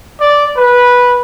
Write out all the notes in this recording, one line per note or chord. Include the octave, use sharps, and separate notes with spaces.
D5
B4